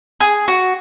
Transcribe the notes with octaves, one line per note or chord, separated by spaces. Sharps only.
G#4
F#4